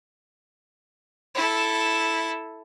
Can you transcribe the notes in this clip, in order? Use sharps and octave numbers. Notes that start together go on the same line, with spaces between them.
E4 A4